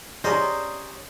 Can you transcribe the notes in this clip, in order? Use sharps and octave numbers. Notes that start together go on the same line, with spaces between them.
C#4 G4 G#4 C5 D5 D#5 A#5